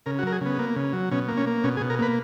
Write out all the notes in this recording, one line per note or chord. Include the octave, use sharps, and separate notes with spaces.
C#3 A#4
F#4
F#3 A#4
G#4
C#3 B3
A#3
C#3
F#3
B2 C#4
A#3
C#4
A#3
B2 C#4
G#4
B2
A#4
A#3 B4